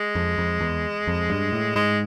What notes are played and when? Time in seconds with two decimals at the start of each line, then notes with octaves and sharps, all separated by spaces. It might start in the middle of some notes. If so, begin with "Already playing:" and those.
Already playing: G#3
0.15 F2
0.38 F2
0.61 E2
1.07 F2
1.30 G2
1.53 A2
1.75 G#2 G#3